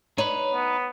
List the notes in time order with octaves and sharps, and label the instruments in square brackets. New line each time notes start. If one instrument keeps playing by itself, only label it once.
[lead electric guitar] D#4 B4 [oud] C#5
[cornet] B3